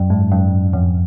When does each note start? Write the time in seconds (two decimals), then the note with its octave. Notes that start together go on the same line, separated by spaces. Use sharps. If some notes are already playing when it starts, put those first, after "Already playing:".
Already playing: F#2
0.10 G#2
0.32 F#2
0.73 F2